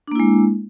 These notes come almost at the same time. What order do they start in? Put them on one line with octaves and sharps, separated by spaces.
D4 A#3 E4 G#3